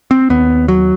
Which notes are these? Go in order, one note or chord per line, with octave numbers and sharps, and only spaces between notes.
C4
D#2 B3
F#3